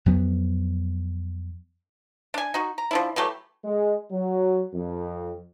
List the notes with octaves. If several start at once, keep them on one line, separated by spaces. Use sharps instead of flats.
F2 F#3 B3
D4 G#5
D#4 F#4
A#5
F3 D4 E4
E3 F#3 A3 G4
G#3
F#3
F2